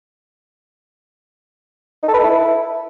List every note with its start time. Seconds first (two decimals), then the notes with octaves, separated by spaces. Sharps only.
2.03 D#4
2.08 A4
2.14 B4
2.19 A4
2.24 E4